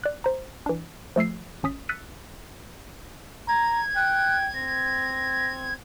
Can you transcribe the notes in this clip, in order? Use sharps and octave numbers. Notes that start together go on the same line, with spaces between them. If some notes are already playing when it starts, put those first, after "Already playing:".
D5 F#6
C5 A#5
E3 D4
F3 A3 E6 C7
G#1 C#4 D#6 B6
E6 F#6 A6 B6 C#7 D#7
A#5 G#6
G5 F#6
C4 A#6